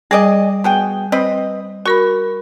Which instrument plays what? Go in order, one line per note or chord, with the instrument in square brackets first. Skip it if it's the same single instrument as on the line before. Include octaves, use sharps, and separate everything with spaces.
[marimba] G3 D#6 [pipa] G#4 D5 D#5
[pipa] B2 G#4 G5
C4 B4 D#5
[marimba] F#4 A#4 B5 [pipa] C#6